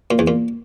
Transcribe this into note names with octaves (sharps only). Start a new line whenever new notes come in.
A#2
E2
A#2